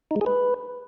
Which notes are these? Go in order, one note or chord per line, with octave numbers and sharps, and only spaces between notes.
D#4
G#3
G#4
B4